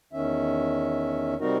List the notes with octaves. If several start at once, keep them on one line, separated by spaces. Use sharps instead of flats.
E2 D#3 C#4 E5
C3 G3 C4 D#4 F#4 A#4